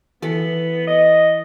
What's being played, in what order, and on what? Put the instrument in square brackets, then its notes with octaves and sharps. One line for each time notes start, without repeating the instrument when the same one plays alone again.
[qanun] E3 A4 [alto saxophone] B3
[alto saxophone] D#5